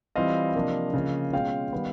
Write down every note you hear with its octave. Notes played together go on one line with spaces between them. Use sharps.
E3 G3 C4 F4 D#5 F5
C3 F3 A#3 D4
C#3 F3 A#3
B2 G#3 C#4 F4 F5 G5
D#3 G3 B3